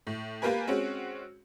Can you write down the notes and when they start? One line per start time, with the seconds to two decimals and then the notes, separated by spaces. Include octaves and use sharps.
0.07 A2
0.42 A#3 F4 G4 A#4 B4 G#5
0.67 G#3 C4 C#4 F#4